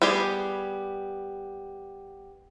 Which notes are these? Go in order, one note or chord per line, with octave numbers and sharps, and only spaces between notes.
G3 B3 G4 G#4